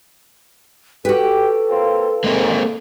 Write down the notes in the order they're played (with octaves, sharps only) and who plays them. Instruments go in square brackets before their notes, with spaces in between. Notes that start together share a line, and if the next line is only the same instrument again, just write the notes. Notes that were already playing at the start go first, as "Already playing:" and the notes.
[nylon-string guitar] F#4 B4 [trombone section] G4 [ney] A4
[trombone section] A#3 C4 F4
[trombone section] A1 G#2 [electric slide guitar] G#3 A#3 C4